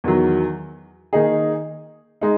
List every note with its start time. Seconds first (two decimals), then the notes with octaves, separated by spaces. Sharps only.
0.04 E2 D#3 F#3
1.13 D#3 A#3 D#4 G#4
2.21 G#3 D#4